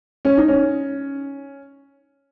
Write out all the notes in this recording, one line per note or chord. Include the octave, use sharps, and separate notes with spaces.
C#4
D#4
C#4